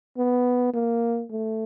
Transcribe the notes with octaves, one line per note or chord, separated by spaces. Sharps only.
B3
A#3
A3